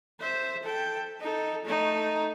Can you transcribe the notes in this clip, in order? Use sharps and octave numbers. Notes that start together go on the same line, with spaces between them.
C5 E5
A4 G5
D#4 A4
A3 D#4